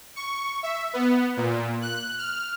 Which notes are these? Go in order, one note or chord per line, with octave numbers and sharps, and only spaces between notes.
C#6
E5
B3
A#2
F#6
F6